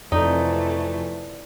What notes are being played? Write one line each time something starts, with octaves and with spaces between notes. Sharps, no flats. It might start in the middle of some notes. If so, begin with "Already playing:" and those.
F2 C3 E3 A3 D#4 D5